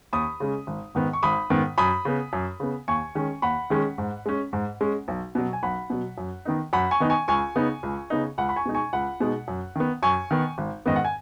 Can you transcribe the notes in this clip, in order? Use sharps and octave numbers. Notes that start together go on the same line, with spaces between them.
D#2 B5 D#6
C#3 G#3 C#4
G#1
G#2 D#3 B3
C#6
G#1 B5 D#6
G#2 D#3 B3
F#2 B5 D#6
C#3 B3
F#2
C#3 B3
D#2 G#5 C#6
D#3 G#3 C#4
D#2 F#5 B5
D#3 G#3 C#4
G#2
G#3 C#4
G#2
G#3 C#4
B1
B2 F#3
G#5
B1 F#5 B5
B2 F#3
F#2
D#3 B3 D#4
F#2 F#5 B5
G#5 C#6
D#3 B3 D#4
G#5 C#6
C#2 G#5 C#6
C#3 B3 D#4
C#2
C#3 B3 D#4
C#2 F#5 B5
B5
G#5 C#6
B2 G#3 D#4
G#5 C#6
C#2 F#5 B5
B2 G#3 D#4
F#2
D#3 B3
F#2 G#5 C#6
D#3 B3
G#1
G#2 D#3 B3 D#5
F#5
G#5